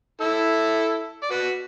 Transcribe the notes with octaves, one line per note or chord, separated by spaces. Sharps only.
E4 A4
D5
F#4 B4